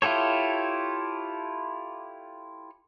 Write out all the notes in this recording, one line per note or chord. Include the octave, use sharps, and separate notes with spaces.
E4 F4 G4 A4 C#5